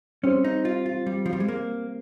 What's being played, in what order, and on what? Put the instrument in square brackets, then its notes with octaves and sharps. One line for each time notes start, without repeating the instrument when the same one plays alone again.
[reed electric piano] G3 C4 G4 C5 [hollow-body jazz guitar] C#4
[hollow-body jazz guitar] D#4
F4
F4
G3
F3
G3
G#3
A#3